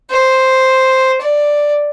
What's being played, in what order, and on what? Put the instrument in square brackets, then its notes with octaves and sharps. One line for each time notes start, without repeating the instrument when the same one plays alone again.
[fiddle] C5
D5